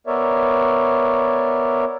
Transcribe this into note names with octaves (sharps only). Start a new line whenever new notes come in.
B3 A#4 C#5 D5 E5